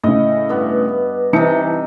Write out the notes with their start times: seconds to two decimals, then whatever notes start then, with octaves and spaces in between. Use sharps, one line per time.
0.04 A2 C#3 D#5
0.49 G2 B3
1.33 C3 E3 D#4 A5 C#7